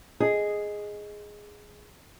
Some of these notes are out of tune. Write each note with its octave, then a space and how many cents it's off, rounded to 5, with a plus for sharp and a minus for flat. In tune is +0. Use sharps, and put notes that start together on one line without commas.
G#4 +0 D#5 +0